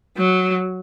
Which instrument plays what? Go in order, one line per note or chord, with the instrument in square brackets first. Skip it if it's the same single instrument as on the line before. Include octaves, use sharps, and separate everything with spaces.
[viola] F#3